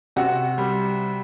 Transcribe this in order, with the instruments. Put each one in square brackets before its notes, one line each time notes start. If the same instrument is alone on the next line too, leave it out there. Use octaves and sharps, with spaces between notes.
[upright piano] C3 F#4
G3